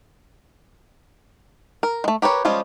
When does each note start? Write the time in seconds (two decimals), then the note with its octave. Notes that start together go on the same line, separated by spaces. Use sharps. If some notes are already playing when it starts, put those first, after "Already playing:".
1.83 A#4
2.04 G#3 A3
2.22 G4 A#4 B4 C#5
2.45 F3 G3 G#3 C#4 F4